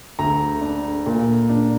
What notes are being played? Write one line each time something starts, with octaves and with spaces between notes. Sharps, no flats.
D2 A#5
D4
A#2
D4